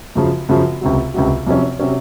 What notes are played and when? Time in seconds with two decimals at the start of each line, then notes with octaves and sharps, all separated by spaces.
0.15 F#2 C#3 F3
0.49 F#2 C#3 F3
0.81 C#2 C3 F#3
1.14 C#2 C3 F#3
1.47 F2 C3 F#3 C#4
1.79 C3 F#3 C#4